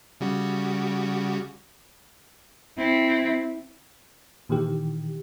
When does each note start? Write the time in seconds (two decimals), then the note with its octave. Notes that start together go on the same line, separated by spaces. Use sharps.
0.21 C#3 G3 F#4
2.78 C4 E4
4.49 A#2 D#3 E3 G4